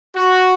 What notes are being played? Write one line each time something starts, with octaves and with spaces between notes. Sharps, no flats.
F#4